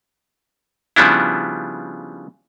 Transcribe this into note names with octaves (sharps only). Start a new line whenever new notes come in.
C#3 F3 G3 B3 D4 E4